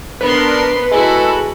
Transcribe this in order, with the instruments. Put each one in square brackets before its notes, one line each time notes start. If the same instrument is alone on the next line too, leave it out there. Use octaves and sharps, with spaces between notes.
[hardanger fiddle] B3 C6 [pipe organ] D4 A#4 [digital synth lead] B4
[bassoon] G#3 [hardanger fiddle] E4 F#4 [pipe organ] A4